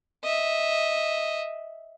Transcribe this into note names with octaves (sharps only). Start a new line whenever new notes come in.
D#5 E5